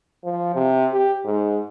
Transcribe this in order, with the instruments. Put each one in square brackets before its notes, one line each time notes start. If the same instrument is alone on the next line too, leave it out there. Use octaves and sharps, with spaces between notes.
[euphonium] F3
C3
G4
G#2